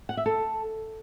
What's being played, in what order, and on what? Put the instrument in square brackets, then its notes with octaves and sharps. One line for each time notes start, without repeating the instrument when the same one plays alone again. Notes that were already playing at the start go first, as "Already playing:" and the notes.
[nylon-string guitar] F#5
E5
A4